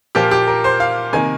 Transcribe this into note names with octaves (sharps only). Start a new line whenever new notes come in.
A#2 F3 A#3 G4
G4
A#4
C5
F5
C3 D#3 A#3 G#5